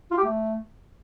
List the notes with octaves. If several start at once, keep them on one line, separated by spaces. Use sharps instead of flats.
F4
G4
A3